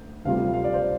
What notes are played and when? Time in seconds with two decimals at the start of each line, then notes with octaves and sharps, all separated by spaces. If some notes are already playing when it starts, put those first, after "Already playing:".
Already playing: D2 G6
0.25 D2 C3 G3 F4 F5
0.54 F5
0.64 D5
0.74 C5